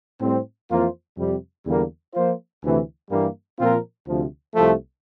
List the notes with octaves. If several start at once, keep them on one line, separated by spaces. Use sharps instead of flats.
A2 G3 C4
F2 E3 A#3 F4 C5
F2 C3 G3
E2 D3 G3 A#3
F3 A#3 F4 C5
D2 C3 E3 A3
G2 E3 G3 A#3
A#2 F3 C4 F4 A#4
D2 C3 F3
C2 C3 F3 A3